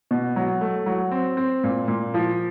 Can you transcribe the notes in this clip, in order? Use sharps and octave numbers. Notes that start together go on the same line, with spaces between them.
B2
F#3
A3
F#3
C4
C4
A#2
A#2
F3